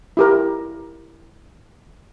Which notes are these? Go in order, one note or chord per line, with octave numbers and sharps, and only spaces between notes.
E4 G4 A#4